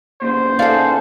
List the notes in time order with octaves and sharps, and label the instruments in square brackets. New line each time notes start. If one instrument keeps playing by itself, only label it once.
[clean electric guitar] A#2 C#3 E3 [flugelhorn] C5
[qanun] D#4 G#4 A4 [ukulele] D5 F5 F#5